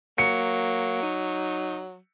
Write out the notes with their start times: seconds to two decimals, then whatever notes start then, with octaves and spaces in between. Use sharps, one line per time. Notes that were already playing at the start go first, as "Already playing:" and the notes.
0.18 F#3 A#3 C#7
1.03 D#4